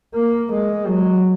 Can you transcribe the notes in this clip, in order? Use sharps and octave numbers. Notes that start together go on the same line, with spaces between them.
A#3
G#3
F#3